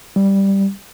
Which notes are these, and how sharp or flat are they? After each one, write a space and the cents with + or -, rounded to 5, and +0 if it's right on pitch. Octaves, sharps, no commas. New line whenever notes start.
G3 +0